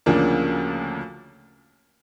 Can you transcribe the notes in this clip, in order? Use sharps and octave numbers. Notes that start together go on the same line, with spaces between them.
D2 C#3 F3 A#3 D4